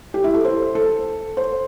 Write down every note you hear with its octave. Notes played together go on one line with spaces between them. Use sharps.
G4
E4
A4
C5
A4
C5